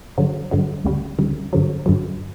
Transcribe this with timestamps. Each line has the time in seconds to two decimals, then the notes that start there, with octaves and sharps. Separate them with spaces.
0.18 G2 D3 F#3
0.51 G2 D3 F#3
0.84 D2 C#3 G3
1.19 D2 C#3 G3
1.53 G2 D3 F#3
1.86 G2 D3 F#3